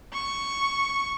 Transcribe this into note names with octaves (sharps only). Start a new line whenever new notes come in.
C#6